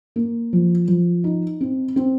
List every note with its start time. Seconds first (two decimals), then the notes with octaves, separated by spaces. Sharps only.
0.16 A#3
0.53 F3
0.88 F3
1.24 D#4
1.61 C4
1.96 C4